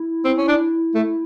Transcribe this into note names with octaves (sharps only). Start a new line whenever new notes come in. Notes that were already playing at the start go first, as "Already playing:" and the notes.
Already playing: E4
C4
C#4
D4
A3